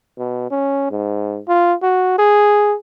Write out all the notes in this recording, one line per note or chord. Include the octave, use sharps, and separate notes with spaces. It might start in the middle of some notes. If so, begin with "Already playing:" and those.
B2
C#4
G#2
F4
F#4
G#4